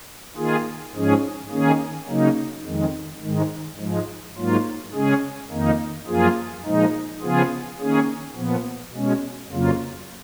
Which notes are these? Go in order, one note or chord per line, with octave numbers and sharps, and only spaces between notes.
D#3 A#3 F4 G#4
G#2 F3 G#3 C#4 G#4
D#3 A#3 C#4 G#4
C#3 F#3 A#3 D#4
F2 D#3 G#3
G#2 D#3 G#3
G#2 F3 G#3
G#2 F#3 A#3 F4
C#3 G#3 C#4 G#4
F2 D#3 A#3 D#4
F#2 F3 A#3 F4 G#4
A#2 F3 G#3 D#4
C#3 F3 B3 F4 G#4
D#3 A#3 C#4 G#4
A#2 F3 B3
B2 G#3 C#4
F2 C#3 F#3 A#3 F4